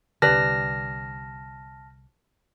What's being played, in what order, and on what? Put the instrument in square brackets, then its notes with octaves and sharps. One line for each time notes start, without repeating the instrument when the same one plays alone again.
[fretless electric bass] C2 D3 [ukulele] G4 B4 D5 [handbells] A5 F6 A#6